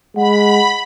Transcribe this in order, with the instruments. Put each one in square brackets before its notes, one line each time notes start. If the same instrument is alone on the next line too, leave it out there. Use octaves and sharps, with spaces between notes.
[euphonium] G#3 [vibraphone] F#5 [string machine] B5